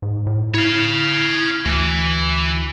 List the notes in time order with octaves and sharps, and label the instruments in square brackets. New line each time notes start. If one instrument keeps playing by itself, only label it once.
[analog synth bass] G#2
A2
[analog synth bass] E4 [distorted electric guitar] C#5 F5
[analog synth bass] D2 [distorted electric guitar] E3